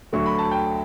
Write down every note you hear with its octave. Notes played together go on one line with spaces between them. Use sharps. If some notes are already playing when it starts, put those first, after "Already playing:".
D2 D3 F#3 C#6
B5
A5
G5